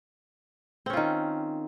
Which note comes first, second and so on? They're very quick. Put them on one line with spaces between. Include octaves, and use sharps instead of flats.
C4 C#4 F4 D#3